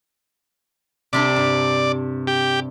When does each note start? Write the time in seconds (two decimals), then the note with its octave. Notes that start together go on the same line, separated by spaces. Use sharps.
1.13 C3 G3 D4 D5
1.36 G2
2.27 G4